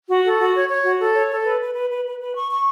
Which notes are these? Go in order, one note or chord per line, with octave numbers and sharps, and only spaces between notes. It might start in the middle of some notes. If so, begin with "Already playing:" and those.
F#4
A4
F#4
C#5
C#5
F#4
A4
C#5
A4
B4
B4
B4
B4
B4
B4
C#6
C#6